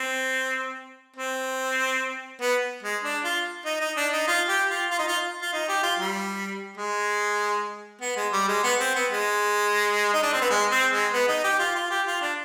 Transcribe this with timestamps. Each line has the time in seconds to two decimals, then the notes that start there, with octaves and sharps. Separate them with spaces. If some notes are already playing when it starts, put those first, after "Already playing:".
Already playing: C4
1.16 C4
2.41 B3
2.83 G#3
3.04 D4
3.24 F4
3.65 D#4
3.81 D#4
3.97 D4
4.13 D#4
4.27 F4
4.49 G4
4.70 F4
4.90 F4
4.99 D#4
5.08 F4
5.42 F4
5.53 D#4
5.69 G4
5.83 F4
5.99 G3
6.77 G#3
8.01 B3
8.17 G#3
8.33 G3
8.48 G#3
8.64 B3
8.80 C4
8.95 B3
9.11 G#3
10.14 D#4
10.23 D4
10.33 C4
10.41 B3
10.50 G#3
10.71 C4
10.93 G#3
11.13 B3
11.28 D#4
11.44 G4
11.59 F4
11.75 F4
11.91 G4
12.07 F4
12.21 D4